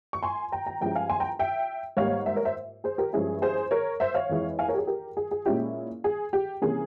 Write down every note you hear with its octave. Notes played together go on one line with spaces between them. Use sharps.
C#6
G#5 C6
G5 A#5
G5 A#5
G2 F3 G#3 C#4 E4 G5 A#5
F5 G#5
G#5 C6
G5 A#5
E5 G5
G#2 G3 A#3 C#5 F5
C5 E5
A#4 C#5
C5 E5
G#4 C5
G4 A#4
G2 F3 G#3 C#4 E4 G#4
G#4 C5
A#4 C#5
C5 E5
C#5 F5
F2 E3 G#3 E4
F5 G#5
A#4 C#5
G4
G#4
G4 A#4
G#4
G#4
A#2 G#3 C#4 E4 G4
G#4
G4
C3 E3 G3 A#3 C#4 G#4